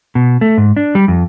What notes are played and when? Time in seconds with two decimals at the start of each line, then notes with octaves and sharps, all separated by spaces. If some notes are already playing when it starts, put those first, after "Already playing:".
0.15 B2
0.41 A3
0.58 G#2
0.77 D4
0.95 G3
1.08 F2